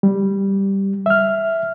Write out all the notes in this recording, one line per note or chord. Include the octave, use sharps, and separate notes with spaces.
G3
E5 F6